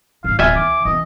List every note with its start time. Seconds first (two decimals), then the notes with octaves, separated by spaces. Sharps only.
0.24 G#2 D#3 F5
0.39 D1 F4 E5 G#5
0.56 D#3 D#4 D6
0.85 E3 C#4 D#5